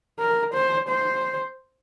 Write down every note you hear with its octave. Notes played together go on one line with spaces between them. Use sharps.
A#4
C5
C5